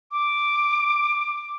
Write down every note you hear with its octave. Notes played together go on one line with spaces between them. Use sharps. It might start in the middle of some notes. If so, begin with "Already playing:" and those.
D6